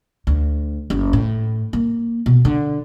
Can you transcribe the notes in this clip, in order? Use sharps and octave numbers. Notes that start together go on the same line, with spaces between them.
D2
F#1
A2
A#3
B2
D3